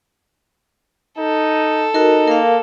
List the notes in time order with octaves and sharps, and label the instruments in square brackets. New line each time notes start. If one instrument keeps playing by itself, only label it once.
[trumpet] D#4 [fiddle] A4
[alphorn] D#4 [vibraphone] F#4 A#4
[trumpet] A#3 [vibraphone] A#4 F5